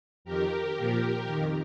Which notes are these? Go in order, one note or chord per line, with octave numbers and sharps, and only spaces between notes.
F2 D#3 G4 A#4
A#2 F3
F2 D#3